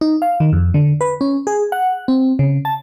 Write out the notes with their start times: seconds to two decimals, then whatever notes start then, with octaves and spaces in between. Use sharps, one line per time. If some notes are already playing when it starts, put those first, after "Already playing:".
0.01 D#4
0.22 F5
0.40 D#3
0.53 F2
0.74 D3
1.01 B4
1.21 C#4
1.47 G#4
1.72 F#5
2.08 C4
2.39 C#3
2.65 A5